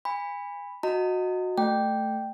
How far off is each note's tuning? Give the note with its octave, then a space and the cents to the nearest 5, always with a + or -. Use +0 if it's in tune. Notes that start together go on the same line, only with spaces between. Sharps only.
G#5 -30 B5 +0
F#4 -15 D#5 +0 A#5 -45
A3 +0 G5 -5